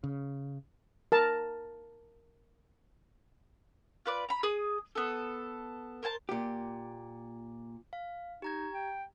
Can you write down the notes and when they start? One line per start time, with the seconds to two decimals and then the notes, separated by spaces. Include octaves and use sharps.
0.04 C#3
1.12 A#4 A5
4.06 F4 B4 D5
4.29 A#5 B5
4.43 G#4 D#6
4.95 B3 A4
6.03 A#4 C5 G#5 A5
6.29 A#2 G4
7.93 F5
8.42 D#4 G4 A#5 G#6
8.74 G5